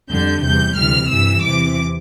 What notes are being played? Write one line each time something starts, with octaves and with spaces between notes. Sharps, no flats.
F2 D3 G3 G6
E2 C3 G3 G6
D2 C3 E3 G3 F6
G2 E3 G3 E6
E2 C3 E3 D6